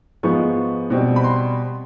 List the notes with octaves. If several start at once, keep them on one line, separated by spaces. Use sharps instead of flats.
G#2 F3 G#3 B3 C#6
B2 G3 C4
B5
C6